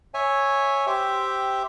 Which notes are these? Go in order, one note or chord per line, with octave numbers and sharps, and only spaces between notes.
C#5 E5 G#5
G4 C5 E5 G5